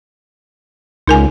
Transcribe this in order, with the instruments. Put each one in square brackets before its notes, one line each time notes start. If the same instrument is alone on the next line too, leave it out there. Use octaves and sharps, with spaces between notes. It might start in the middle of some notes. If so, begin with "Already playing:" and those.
[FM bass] C#2 [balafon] D#4 A#4 G#5